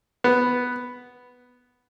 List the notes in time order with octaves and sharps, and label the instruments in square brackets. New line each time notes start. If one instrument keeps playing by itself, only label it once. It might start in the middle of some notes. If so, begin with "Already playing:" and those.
[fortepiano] B3